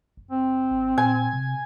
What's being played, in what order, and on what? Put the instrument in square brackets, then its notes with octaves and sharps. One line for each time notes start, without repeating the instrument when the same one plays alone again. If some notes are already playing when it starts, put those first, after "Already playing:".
[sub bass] F#1
[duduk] C4
[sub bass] G#1
[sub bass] A#2 [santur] G#5
[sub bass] C3